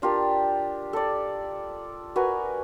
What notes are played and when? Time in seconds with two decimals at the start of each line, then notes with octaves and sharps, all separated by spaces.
0.02 D4 F4 G4 A#4
0.93 A4 D5
2.16 F#4 A#4 B4 G#5